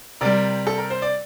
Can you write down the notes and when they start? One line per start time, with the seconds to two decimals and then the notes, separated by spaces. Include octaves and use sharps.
0.21 C3 G3 A#4 D5
0.67 A4
0.78 A#4
0.90 C5
1.02 D5